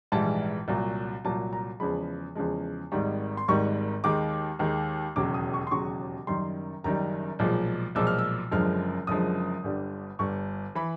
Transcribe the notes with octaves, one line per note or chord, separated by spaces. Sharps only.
A#1 G#2 E3 G3 A5
C2 A#2 F#3
C2 A#2 F#3 A5
A#5
E2 C#3 F3 G#3 B5
E2 C#3 F3 G#3
G#1 G#2 D#3 G3
C6
G#1 G#2 D#3 G3 C#6
D#2 D#3 G#3 D6
D#2 D#3 G#3
E1 D#2 C#3 F#3 D6
D#6
C#6
C6
E1 D#2 C#3 F#3 C#6
F#1 F#2 D#3 G3 C6
F#1 F#2 D#3 G3 A#5
B1 A#2 F3 G#3
B1 A#2 F3 G#3 E6
F6
E6
F#1 F#2 D3 F3 G#3 F6
F#1 F#2 D3 F3 G#3 D#6
G1 G2 D3 G3
G1 G2 D3 G3 C#6
E3 B5